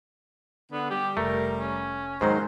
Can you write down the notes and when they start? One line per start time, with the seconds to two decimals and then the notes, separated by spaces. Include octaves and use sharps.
0.72 D3 B3
0.90 G3 G4
1.17 F1 A3 A#4
1.59 C#4
2.21 G#2 D#3 F#3 G#3 C5